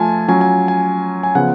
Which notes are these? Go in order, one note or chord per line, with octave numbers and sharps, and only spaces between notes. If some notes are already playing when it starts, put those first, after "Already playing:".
Already playing: F3 A3 F4 G#5 A5
F#3 C#4 F4 G#5
G#5
G#5
G#5
C#3 F3 B3 F4 F#5